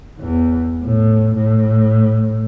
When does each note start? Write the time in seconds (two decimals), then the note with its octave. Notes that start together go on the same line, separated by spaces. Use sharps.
0.20 E2
0.83 A2
1.36 A2